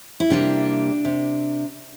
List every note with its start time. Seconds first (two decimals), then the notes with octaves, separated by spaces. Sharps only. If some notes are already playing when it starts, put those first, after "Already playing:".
0.20 E4
0.30 C3 G3 A#3 D4
1.05 C3